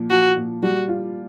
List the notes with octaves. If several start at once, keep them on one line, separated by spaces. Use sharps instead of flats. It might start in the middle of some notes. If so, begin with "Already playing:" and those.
Already playing: A#2 F3
F3 F#4
A#2
G3 F#4
F4